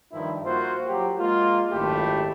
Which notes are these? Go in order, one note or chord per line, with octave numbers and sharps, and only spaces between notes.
G2 D#3 F3 E4
A#3 F4 F#4 C5
F#3 G4
G#3 A#3 F4
G#1 F#2 A3 E4 G4